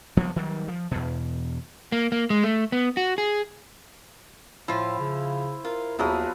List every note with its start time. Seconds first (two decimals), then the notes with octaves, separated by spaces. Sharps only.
0.17 F#1 F3 G3 B3
0.36 D#3 F#3 G3
0.68 F3
0.91 E2 B2
1.92 A#3
2.12 A#3
2.30 G#3
2.44 A3
2.72 B3
2.97 F#4
3.18 G#4
4.68 A2 F3 E4 F4 C5
4.99 C#3
5.65 F4 A#4
5.99 D#2 F3 F#3 B3 E4 G#4